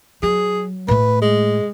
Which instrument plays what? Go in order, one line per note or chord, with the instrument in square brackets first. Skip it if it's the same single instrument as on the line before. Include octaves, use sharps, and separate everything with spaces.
[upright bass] F#3 [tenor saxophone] G#4
[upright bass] A2 A3 [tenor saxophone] B4
[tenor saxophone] G#3